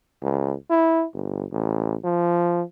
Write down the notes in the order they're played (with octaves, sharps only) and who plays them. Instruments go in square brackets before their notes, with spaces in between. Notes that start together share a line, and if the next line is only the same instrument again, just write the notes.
[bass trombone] C#2
E4
G1
A1
F3